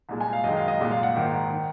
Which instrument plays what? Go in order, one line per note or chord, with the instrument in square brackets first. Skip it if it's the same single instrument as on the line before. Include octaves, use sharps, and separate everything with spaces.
[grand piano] C2 A#2 G#3
G#5
F5
F#2 D#3 G#3 D#5
F5
D#5
C2 A#2 G#3
F5
F#5
G#1 G#2 D#3 A#3
D#3